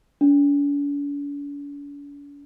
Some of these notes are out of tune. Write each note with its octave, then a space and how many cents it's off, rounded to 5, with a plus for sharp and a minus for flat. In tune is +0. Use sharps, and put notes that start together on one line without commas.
D4 -45